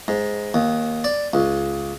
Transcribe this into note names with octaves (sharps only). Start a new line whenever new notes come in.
G#2
D#2
D5
C#2